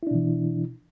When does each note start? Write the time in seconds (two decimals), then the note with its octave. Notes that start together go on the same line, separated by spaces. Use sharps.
0.03 E4
0.07 D4
0.11 B2
0.15 E3